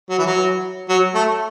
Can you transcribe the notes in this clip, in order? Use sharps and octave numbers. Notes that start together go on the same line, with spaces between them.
F#3
E3
F#3
F#3
A3